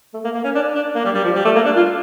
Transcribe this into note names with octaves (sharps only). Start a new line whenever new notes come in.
A3
A#3
A#3
C#4
D4
D4
A#3
G3
G3
F3
G3
A3
A#3
D4
F4